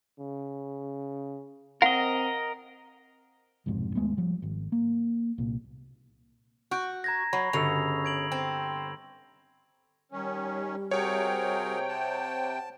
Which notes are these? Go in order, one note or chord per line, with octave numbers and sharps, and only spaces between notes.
C#3
C4 A#4 D#5 F#5
B1 F2 G#2 C3
D#2 G#3 A3 B3
F3 G3
G#1
A#3
C2 A#2
F#4 F#6 G6 D7
A#5 G#6 A#6
F#3 B5 C#6 C7
G1 C#3 F#4 E6 C#7 F7
G#6 D7 F#7
C4
D#3 G3 C#4
C3 F#4 G#4 A#4 C#5 G5
F#5 A5